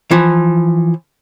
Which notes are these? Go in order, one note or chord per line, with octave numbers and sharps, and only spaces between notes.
E3 F3